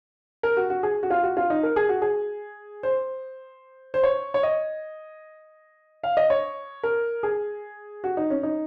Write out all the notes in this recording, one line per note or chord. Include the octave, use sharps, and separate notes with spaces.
A#4
F#4
F#4
G#4
F#4
F4
F#4
F4
D#4
A#4
G#4
F#4
G#4
C5
C5
C#5
C#5
D#5
F5
D#5
C#5
A#4
G#4
F#4
D#4
C#4
D#4